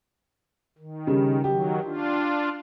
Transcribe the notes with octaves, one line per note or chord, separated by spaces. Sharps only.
D#3
C#3 G3
D#3 F#3 G4
D4 F4